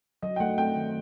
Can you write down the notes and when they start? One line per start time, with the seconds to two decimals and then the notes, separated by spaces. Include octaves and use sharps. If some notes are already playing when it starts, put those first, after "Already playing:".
0.22 F#3 D#5
0.36 G5
0.40 A3 F#5
0.58 C4 G5
0.76 D#3